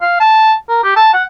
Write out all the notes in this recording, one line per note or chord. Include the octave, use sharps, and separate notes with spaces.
F5
A5
A#4
G4
A5
F#5